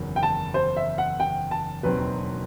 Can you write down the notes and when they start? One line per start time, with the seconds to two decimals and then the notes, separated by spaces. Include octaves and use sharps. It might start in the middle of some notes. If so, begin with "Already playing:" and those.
Already playing: F#1 E2 D#3 F#3
0.16 G5
0.23 A5
0.54 C5
0.76 E5
0.98 F#5
1.20 G5
1.51 A5
1.83 E1 D#2 D#3 F#3 C4 B4